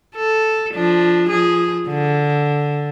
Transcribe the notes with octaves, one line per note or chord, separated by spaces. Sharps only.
A4
F3 D4
F3 G#4
D3